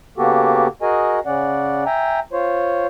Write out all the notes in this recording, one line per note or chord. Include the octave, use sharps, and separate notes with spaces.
C#3 A#3 B3 F#4 G4 A4
F#4 G#4 A#4 D#5 G#5
C#3 C#4 D5 F#5
E5 G5 G#5 A#5
F4 C5 C#5